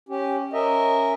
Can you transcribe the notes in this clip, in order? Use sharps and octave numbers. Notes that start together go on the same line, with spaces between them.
C#4 G4
C#4 A#4 D#5 E5